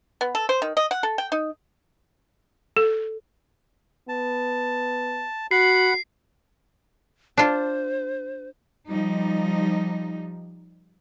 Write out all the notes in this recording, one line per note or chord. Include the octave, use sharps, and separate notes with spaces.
B3
A4
C5
D#3
D#5
F#5
A4
G5
D#4
A4
B3 A5
F#4 F#5 B5 C7
D4 F4 C5
F3 G3 D#4